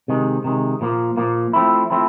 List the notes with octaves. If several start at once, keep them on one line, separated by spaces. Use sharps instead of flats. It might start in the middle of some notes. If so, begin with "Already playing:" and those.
C3 D#3 G#3
C3 D#3 G#3
A#2 F3 A#3
A#2 F3 A#3
F3 A3 C4 E4
F3 A3 C4 E4